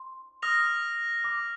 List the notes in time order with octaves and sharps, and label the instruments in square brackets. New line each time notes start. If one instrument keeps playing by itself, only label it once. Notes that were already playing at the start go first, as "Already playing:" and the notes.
Already playing: [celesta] C6
[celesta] D#6 [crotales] F6 A#6 F7
[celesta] D6